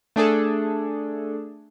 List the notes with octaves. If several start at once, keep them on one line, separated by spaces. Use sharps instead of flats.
A3 D4 G#4 A4